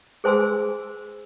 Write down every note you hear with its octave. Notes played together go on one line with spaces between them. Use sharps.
G#4 C5 G#5 C6 E6